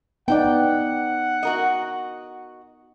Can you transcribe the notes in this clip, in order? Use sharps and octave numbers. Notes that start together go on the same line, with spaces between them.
B3 D#4 D5 F#5 G5
F#4 A#4 D#5